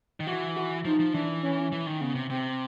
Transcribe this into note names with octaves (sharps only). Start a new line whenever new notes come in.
D#3
E3 F#4
F#4
F3 D#4
F3
E3 D4
C#4
E3
D#3
C#3 B3
C3
C3 C4